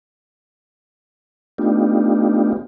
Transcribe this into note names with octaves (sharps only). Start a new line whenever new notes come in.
A3 B3 D4 D#4 F4 G4